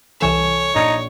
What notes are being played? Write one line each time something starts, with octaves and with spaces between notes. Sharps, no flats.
C2 E3 A4 C#5 G#5 E7
A#1 D#4 G#6 C#7